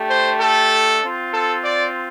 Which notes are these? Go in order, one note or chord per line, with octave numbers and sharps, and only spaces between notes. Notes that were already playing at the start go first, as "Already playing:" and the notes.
Already playing: A3 D4 G4
C5
A4
C4 F4
A4
D5